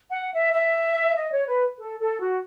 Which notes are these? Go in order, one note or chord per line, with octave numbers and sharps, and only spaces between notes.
F#5
E5
E5
D#5
C#5
B4
A4
A4
F#4